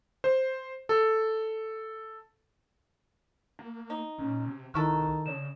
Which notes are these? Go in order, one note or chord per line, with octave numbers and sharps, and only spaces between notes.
C5
A4
A#3
D#4
A#2 C#4
C3
C2 D#3 B3 E4 A4 C#6 F6 F#6
C#3 C#5 D5 E7